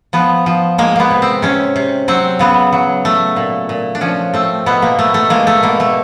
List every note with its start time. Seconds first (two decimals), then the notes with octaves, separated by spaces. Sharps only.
0.13 F3 B3
0.46 F3
0.78 G#3 A#3
0.96 A#3 B3
1.11 C3
1.22 C4
1.42 C3 C#4
1.76 C3
2.08 F#3 C4
2.39 C#3 B3
2.73 F#3
3.05 A3
3.36 A#2
3.69 A#2
3.95 D4
4.01 F3 C#4
4.34 A3 C4
4.66 B2 B3
4.82 A#3
4.98 B2 A3
5.14 A3
5.30 G#3 A#3
5.47 A3
5.63 B2 A#3
5.80 A3